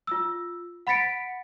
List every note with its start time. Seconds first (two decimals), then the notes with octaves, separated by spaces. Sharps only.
0.07 F4 E6
0.87 F#5 B5 A6 B6 C#7 D7